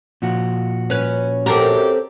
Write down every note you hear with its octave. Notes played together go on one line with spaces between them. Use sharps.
A#2 F3 F#4
C#4 B4
F#2 C4 G4 A4 A#4